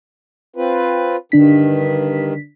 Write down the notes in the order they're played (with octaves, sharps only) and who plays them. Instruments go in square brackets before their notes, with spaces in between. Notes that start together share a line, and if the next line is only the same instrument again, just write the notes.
[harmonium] C4 F4 B4
[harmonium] G2 D#3 [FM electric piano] D3 D4 B6